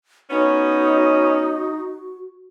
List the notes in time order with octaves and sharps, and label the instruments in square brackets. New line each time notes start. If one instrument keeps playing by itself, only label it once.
[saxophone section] B3 C#4 [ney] D#4 [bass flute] F#4